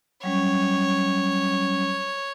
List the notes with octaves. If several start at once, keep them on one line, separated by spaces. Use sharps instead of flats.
F#3 G3 C#4 C#5